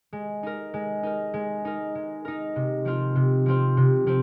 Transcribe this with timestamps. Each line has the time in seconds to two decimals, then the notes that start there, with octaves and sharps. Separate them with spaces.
0.13 G#3
0.43 D#4 A#4
0.74 G#3
1.03 D#4 A#4
1.34 G#3
1.65 D#4 A#4
1.95 G#3
2.25 D#4 A#4
2.56 C3
2.85 F3 C4 F4 C5
3.16 C3
3.46 F3 C4 F4 C5
3.77 C3
4.07 F3 C4 C5